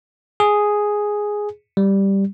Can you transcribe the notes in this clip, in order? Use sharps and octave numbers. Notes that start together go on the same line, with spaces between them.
G#4
G3